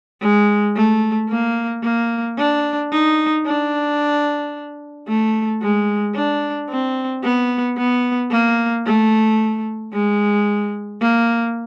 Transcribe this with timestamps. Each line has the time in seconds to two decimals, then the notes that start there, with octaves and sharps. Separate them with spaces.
0.21 G#3
0.76 A3
1.29 A#3
1.83 A#3
2.38 D4
2.92 D#4
3.45 D4
5.08 A3
5.62 G#3
6.15 D4
6.69 C4
7.23 B3
7.77 B3
8.31 A#3
8.86 A3
9.93 G#3
11.01 A#3